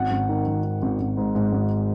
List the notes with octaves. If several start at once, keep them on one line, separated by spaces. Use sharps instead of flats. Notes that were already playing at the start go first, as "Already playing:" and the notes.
Already playing: G#1 F#5
G#1
D#3
G#1
D#3
G#1
G#1
G#2
G#2
G#1